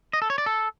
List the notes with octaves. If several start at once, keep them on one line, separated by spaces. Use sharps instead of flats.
D#5
A4
C#5
D5
A4